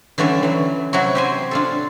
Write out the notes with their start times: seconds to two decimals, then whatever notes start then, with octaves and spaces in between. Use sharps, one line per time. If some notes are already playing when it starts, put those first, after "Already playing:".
0.18 D3 E3 G3 A3 C#4
0.43 E3 F#3
0.93 C3 F#3 E4 F#4
1.15 G4 C5 G#5
1.51 D4 F4 A4